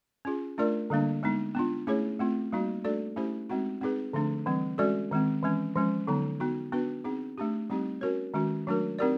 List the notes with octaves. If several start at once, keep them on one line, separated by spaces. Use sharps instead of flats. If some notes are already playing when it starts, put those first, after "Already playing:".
C#4 F4 G#4
A3 D4 F4 A#4 D5
D3 G3 A#3 D4
G#3 B3 D#4
B3 D4 F4
A3 C#4 E4 G#4 C#5
A3 C4 F4
G3 A#3 D#4 F#4
A3 D4 F#4 A4 D5
A3 C#4 E4 G4 C5
G#3 C4 D#4 F#4
C4 D#4 G#4 B4
D3 F3 A3 D4
E3 G3 C4
G#3 C#4 F#4 A4 D5
D#3 G#3 C4
E3 G#3 C#4
F3 G#3 C#4
D3 F#3 B3 D#4
B3 D#4 F#4
B3 D4 F#4 B4
C4 D#4 G#4
A3 D4 G4
G3 C4 D#4 G4
C#4 F#4 A#4 C#5
D#3 G#3 C#4 F#4
F#3 A3 D4 F#4 A#4
C4 D#4 G4 A#4 D5